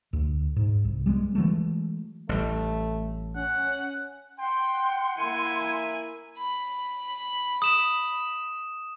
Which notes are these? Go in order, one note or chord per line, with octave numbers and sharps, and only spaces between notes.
D2
G#2
C2
G3 G#3 B3
E3 F#3 G#3 A3
A1 G3 A3
C#4 F#5
F#5 G5 C6
A#3 E4 G#5
B5
D#6 E7